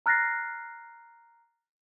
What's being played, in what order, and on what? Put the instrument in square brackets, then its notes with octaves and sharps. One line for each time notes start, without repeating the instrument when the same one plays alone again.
[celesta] A#5 F6 F#6 A6 A#6 C7